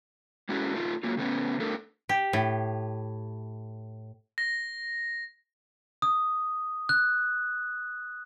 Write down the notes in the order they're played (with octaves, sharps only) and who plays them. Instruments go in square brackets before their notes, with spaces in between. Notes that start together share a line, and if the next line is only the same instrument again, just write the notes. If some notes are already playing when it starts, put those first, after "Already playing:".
[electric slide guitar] G#3 C#4 E4 F#4 G#4 A4
A3 D#4 F4
F#3 A#3 F4
C#3 A3 B3 C#4
A3 D4 A4 A#4
[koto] G4
A2
[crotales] A#6
[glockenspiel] D#6
F#6